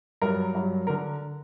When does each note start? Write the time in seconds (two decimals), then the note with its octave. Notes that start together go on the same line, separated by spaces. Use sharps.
0.22 G2 F#3 A#4
0.55 G2 F#3
0.87 A#4
0.90 D3